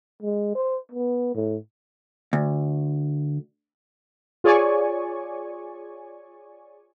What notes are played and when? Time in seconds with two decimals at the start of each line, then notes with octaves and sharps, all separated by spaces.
0.22 G#3
0.55 C5
0.92 B3
1.35 A2
2.33 D2
4.44 F4 G#4 C#5 D5 G#5 C#6